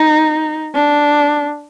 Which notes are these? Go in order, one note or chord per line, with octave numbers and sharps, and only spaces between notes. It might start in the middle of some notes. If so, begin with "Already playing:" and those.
Already playing: D#4
D4